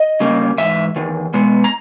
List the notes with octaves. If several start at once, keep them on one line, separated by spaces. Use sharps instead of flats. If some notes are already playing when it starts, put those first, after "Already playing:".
Already playing: D#5
C#3 G3 A#3
G#2 E3 E5
E2 D#3
B2 G#3 B3
A#5